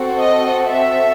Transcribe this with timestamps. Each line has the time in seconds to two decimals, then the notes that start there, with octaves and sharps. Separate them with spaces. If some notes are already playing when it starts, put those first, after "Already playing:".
Already playing: C4 F#4 A4
0.19 D#5
0.67 E5